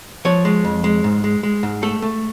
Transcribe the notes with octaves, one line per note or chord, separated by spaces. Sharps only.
F3 C#5
G#3
F2
G#3
G#2
G#3
G#3
G#2
A3 A4
A3